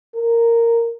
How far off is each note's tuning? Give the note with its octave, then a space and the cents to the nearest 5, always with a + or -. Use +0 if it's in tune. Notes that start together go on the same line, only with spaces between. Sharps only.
A#4 -10